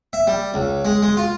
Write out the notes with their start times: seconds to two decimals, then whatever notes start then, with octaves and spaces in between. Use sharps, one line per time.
0.13 E5
0.27 G3
0.54 C#2
0.85 G#3
1.03 G#3
1.17 F4